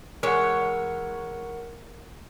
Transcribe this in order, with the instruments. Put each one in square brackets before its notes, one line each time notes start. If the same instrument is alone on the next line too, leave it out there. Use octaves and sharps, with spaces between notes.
[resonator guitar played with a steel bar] E3 G#3 C#5 [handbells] A#4 F#5